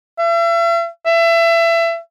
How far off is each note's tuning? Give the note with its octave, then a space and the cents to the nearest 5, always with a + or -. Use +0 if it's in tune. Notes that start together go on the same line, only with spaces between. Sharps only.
E5 +40
E5 +25